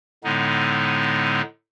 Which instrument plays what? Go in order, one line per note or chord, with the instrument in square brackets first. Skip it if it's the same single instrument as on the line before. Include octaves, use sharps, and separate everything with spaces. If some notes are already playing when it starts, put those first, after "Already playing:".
[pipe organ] A2 D3 G#3 B3 D#4